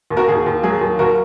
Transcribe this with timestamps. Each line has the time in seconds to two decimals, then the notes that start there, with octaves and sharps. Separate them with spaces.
0.10 D#2
0.17 F#4 A#4
0.28 D#2 G#4
0.46 D#2
0.63 F#3 G#4
0.81 D#2
0.99 D#2 F#4 A#4